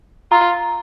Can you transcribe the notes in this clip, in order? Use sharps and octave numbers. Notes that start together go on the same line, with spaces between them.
F4 A#5